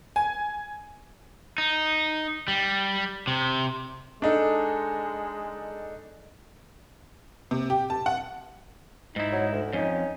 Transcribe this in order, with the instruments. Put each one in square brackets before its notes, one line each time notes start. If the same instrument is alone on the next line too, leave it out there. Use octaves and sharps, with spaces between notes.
[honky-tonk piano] G#5
[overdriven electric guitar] D#4
G3
C3
[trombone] G#3 [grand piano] D4 D#4 A4
[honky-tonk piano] C3
G4
A5
F#5
[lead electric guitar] G#2 E4 [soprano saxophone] D#4
[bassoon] F#3
D2
[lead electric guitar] F2 [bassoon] C#4 [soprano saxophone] D#4